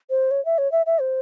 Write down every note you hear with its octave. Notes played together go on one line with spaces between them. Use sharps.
C5
C#5
E5
C#5
E5
E5
C5